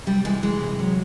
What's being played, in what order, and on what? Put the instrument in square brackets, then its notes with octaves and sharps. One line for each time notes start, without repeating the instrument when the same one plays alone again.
[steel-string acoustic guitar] C3 G3
E3 G#3
E3 G#3
C3
F#3